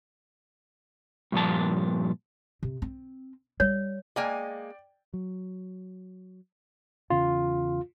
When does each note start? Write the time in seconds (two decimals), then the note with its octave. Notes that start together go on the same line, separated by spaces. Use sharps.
1.32 G2 A#2 F3 A5
2.63 C3
2.82 C4
3.60 G3 C#5
4.16 G#3 A#3 D5 G5 G#5
5.13 F#3
7.10 E2 C#3 F4